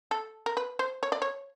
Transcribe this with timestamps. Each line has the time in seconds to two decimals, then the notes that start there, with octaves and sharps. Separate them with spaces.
0.11 A4
0.46 A#4
0.57 B4
0.79 C5
1.03 C#5
1.12 D5
1.22 C#5